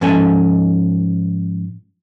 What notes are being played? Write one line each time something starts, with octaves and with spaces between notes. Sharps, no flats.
G#2 F3 C#4 A4 G#5